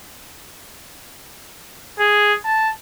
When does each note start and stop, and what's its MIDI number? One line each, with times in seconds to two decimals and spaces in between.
1.99 2.34 68
2.44 2.69 81